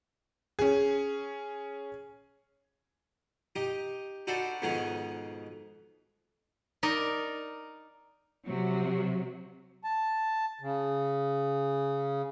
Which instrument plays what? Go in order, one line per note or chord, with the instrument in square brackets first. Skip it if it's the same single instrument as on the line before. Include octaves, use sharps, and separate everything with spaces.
[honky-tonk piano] C#4 G#4
[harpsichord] D#4 G4 D#5
D#4 F#4 A4 C5 D5 B5
F2 G#2 B2 D#3 D#4 F#5
[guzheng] D#4 A#4 D5
[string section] C3 F#3
[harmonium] A5
C#3